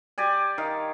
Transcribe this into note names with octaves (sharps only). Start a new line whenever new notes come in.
G4 D5 G#5
D#3 F5